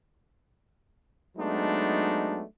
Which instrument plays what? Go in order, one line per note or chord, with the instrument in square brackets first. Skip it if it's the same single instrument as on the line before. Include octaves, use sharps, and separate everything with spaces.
[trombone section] F#3 G#3 A3 B3 D4 D#4